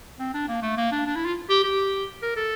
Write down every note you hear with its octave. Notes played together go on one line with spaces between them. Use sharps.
C4
D4
A#3
A3
A#3
D4
D4
E4
F4
G4
G4
A#4
A4